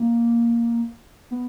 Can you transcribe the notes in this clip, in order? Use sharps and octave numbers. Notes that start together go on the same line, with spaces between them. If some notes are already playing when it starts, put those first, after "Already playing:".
Already playing: A#3
B3